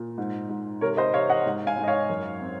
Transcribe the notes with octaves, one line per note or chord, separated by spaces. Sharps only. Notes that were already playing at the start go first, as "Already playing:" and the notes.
Already playing: A#2
G#2
G#2
C3 A#4 C#5
C5 D#5
C3 C#5 F5
D#5 F#5
G#2
F5 G#5
G#2
D#5
C#5 F5
F#2
C4